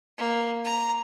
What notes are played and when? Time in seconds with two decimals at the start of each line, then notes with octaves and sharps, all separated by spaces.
0.18 A#3
0.64 A#5